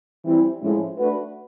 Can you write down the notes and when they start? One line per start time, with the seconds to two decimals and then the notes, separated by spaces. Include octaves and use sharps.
0.25 E3 G3 C4 E4
0.61 A2 F3 G#3 C#4 E4
0.99 A3 D4 F#4 B4